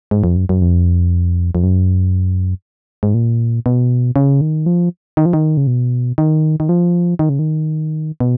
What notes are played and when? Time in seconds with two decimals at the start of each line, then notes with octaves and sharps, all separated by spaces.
0.11 G#2
0.24 F2
0.36 F#2
0.49 F#2
0.62 F2
1.55 F2
1.63 F#2
3.03 G#2
3.14 A#2
3.66 B2
4.16 C#3
4.41 D#3
4.66 F3
5.17 D#3
5.26 F3
5.33 D#3
5.57 C#3
5.67 B2
6.18 D#3
6.60 D#3
6.69 F3
7.19 D#3
7.29 C#3
7.39 D#3
8.20 B2